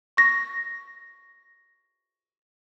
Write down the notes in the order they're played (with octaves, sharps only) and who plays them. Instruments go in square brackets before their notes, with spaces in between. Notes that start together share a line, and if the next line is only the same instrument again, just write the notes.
[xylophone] C#6 A#6